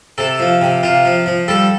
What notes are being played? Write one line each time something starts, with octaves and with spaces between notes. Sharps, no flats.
C3 A4
F3
C3
C3 F4
F3
F3
G3 A4